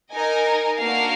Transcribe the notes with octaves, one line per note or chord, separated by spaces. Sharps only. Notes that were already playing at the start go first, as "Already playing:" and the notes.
D#4 A#4 D#5 G#5
A#3 D4 F#4 A#4 F5